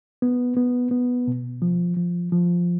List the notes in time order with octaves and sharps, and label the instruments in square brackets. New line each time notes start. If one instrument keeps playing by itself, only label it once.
[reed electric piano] B3
B3
B3
B2
F3
F3
F3